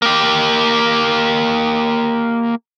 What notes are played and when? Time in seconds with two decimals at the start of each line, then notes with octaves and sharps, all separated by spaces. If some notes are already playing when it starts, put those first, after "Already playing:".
0.02 A#3 G4